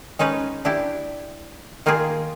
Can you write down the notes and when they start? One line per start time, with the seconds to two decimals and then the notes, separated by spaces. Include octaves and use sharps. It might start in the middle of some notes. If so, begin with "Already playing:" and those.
0.19 G#3 C#4 D#4 B4
0.65 D4 E4 G4
1.86 D#3 A#3 F4 G4 G#4